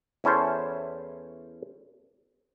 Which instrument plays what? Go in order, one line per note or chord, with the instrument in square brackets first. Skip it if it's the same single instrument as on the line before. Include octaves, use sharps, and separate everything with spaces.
[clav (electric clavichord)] E2 C#4 E4 A4 C5